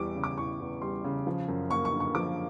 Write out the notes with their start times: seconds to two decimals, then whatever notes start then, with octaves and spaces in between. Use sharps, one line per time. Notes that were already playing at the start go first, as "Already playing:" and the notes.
Already playing: E2 E3 G3 C#6 D6
0.15 C#3
0.24 D6
0.37 E3 C#6
0.60 E2
0.82 G3 C6
1.04 C#3
1.27 F3
1.48 F#2
1.70 A#3 C#6
1.85 C#6
1.92 D3
2.00 C#6
2.15 F3 D6